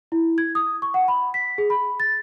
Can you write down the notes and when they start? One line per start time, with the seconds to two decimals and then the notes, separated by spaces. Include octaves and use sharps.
0.12 E4
0.38 G#6
0.55 D#6
0.82 C#6
0.94 F#5
1.08 B5
1.34 B6
1.58 G#4
1.70 B5
2.00 A6